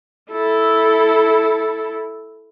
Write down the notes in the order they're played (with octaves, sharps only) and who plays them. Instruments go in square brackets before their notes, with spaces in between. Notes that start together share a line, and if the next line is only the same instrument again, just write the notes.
[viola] E4 A4